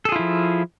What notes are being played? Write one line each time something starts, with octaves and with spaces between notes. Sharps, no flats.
F3 E4 F4 G#4 A4